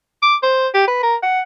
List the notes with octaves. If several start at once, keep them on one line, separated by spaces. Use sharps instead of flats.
D6
C5
G4
B4
A#4
F#5